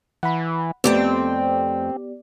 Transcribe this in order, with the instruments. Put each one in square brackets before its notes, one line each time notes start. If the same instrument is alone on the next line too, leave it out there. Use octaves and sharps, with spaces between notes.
[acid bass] E3 [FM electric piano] F#5 B5
[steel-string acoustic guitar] F2 A3 G5 [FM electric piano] B3 G4 D5 [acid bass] C4